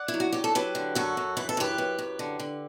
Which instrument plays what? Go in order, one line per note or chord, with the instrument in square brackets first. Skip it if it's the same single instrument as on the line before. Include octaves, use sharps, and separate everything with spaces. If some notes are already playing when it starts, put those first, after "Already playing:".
Already playing: [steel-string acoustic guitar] D5 F#5
E4
F#3
F#4
F#3 G4
A4
F#3 G4 B4
D3
F#2 F#4 A4
F#2
E3 B4
A4
F#2 G4 B4
F#2
F#2
D3
D3